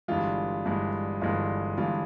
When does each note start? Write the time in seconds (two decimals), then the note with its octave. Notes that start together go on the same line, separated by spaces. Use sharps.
0.08 G1 G2 E3 G#3 F4
0.65 G1 G2 E3 G#3
1.21 G1 G2 E3 G#3 F4
1.78 G1 G2 E3 G#3 F4